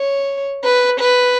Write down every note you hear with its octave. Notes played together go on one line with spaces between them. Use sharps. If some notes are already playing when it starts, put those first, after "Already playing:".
Already playing: C#5
B4
B4